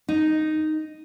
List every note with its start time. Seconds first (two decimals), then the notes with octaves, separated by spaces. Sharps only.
0.08 D#4